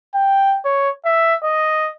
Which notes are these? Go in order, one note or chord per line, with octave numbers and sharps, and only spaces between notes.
G5
C#5
E5
D#5